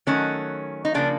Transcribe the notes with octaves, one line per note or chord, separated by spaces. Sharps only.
D#3 F#3 A3 C#4
D#4
C#3 F3 A#3 D4